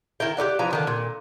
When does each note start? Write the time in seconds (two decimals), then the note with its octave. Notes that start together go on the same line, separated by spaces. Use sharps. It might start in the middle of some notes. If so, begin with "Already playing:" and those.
0.20 D#3 E4 A#4 G5
0.37 G4 A#4 D5 F#5
0.59 E3 F3 A#5
0.71 D3 D#3 D4
0.87 A#2